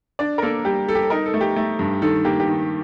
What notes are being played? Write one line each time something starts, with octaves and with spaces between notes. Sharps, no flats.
D4 D5
A#4
A#3 A4
G3 G4
G3 A4
G4
A4
D#4 A#4
A4
A3
G4
A3
G2
D#3 A4
A#3 G4
G4
D#3